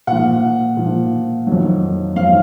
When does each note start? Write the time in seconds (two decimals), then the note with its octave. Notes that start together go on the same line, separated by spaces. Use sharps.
0.07 A#2 F3 F#5
0.77 A#2 F3
1.47 F2 D#3 F#3
2.16 F2 D#3 F#3 F5